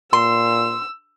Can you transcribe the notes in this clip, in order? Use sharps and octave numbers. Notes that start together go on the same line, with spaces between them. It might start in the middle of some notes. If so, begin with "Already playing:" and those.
A#2 C6 E6